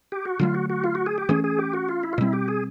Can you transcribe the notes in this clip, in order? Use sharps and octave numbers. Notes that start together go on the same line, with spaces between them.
G4
F#4
D3 F#3 A3 F4
F#4
F#4
F4
F#4
G#4
G4
E3 A3 C#4 G#4
G#4
G4
F#4
F4
E4
F4
B2 G3 C4 E4
G4
G#4